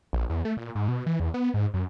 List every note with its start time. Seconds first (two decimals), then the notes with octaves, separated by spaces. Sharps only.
0.13 A#1
0.30 E2
0.45 A3
0.57 A#2
0.75 G#2
0.88 B2
1.06 E3
1.20 E2
1.34 B3
1.54 G#2
1.74 F#2